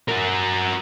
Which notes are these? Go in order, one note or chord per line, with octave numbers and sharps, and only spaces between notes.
F#4 A#4